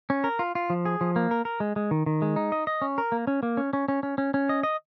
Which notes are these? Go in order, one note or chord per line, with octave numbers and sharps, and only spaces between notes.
C#4
A#4
F4
F4
F3
G#4
F3
A#3
A#4
A#4
G#3
G#3
D#3
D#3
G#3
D#4
D#5
D#5
C#4
A#4
A#3
C#4
A#3
C#4
C#4
C#4
C#4
C#4
C#4
D#5
D#5